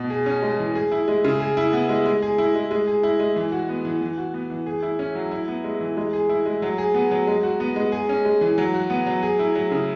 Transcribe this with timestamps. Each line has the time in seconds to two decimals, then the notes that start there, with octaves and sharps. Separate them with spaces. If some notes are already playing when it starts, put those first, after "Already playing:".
Already playing: B2
0.10 G#4
0.26 C#4
0.43 G#3
0.59 E3
0.75 G#4
0.92 E4
1.08 G#3
1.25 C#3
1.40 G#4
1.57 E4
1.73 B3
1.89 G#3
2.06 G#3
2.22 G#4
2.38 E4
2.55 G#3
2.71 G#3
2.87 G#4
3.03 E4
3.20 G#3
3.36 E3
3.52 F#4
3.69 B3
3.85 E3
4.01 E3
4.18 F#4
4.34 B3
4.50 E3
4.66 G#4
4.83 E4
4.99 C#4
5.15 F#3
5.31 E4
5.48 B3
5.64 G#3
5.81 E3
5.97 G#3
6.13 G#4
6.29 E4
6.46 G#3
6.62 F#3
6.78 G#4
6.94 B3
7.11 F#3
7.27 G#3
7.43 F#4
7.60 B3
7.76 G#3
7.92 G#4
8.09 C#4
8.25 G#3
8.41 E3
8.58 F#3
8.74 F#4
8.90 B3
9.06 F#3
9.23 G#4
9.39 E4
9.55 F#3
9.72 C#3